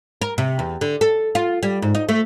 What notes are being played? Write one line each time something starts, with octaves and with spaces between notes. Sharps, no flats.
A#4
C3
E2
D3
A4
F4
G3
G#2
D#4
A3